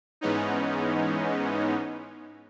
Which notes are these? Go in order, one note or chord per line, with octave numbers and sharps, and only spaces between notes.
G#2 E3 G#3 B3 C#4 D#4